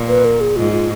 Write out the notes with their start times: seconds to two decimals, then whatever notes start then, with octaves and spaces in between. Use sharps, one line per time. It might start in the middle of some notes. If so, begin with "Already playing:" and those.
Already playing: A#2
0.08 B4
0.25 A#4
0.41 G#4
0.56 G#2 F4
0.72 F4